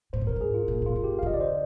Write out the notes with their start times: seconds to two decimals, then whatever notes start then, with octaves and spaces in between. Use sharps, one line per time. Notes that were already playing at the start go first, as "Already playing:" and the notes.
0.13 A#2 C5
0.21 G#2
0.27 G2 A#4
0.36 G#2 G#4
0.54 F4
0.68 A#2
0.82 A#2 F4
0.96 G2
1.04 G4
1.19 F5
1.23 D3 D#5
1.34 D5
1.41 C5